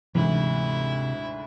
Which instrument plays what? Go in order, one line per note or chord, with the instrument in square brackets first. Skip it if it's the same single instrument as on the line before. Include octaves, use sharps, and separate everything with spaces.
[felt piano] D2 G#2 [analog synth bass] C3 [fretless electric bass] E3 [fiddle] E4